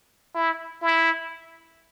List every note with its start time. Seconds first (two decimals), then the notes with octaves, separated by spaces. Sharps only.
0.35 E4
0.82 E4